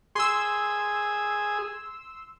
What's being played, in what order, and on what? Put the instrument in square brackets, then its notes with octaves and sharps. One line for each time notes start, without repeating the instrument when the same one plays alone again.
[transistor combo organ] G#4 [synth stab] C6 E6